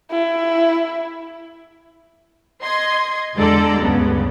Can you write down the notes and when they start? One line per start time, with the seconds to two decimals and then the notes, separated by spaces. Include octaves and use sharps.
0.11 E4
2.63 D#5 C6 G#6
3.35 E2 D3 G#3 A4 D5 A#5
3.81 D2 G2 C#3 B3